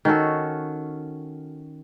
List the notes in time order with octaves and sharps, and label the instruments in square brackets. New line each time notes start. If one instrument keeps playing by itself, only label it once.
[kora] D#3 C#4 F#4 A4